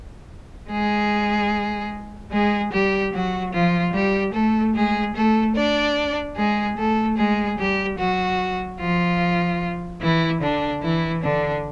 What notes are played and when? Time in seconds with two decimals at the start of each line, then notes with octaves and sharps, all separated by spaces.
0.70 G#3 G#4
2.31 G#3 G#4
2.72 G3 G4
3.12 F#3 F#4
3.53 F3 F4
3.93 G3 G4
4.34 A3 A4
4.75 G#3 G#4
5.15 A3 A4
5.55 D4 D5
6.36 G#3 G#4
6.77 A3 A4
7.17 G#3 G#4
7.58 G3 G4
7.98 F#3 F#4
8.79 F3 F4
10.01 E3 E4
10.41 D3 D4
10.82 E3 E4
11.22 D3 D4